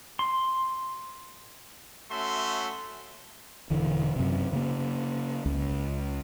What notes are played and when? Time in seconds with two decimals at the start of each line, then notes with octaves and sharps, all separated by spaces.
0.19 C6
2.11 A3 C#4 F#4 E5 C6
3.70 E1 D3 E3
4.16 F#2 C3
4.53 C#3 A#3
5.46 C#2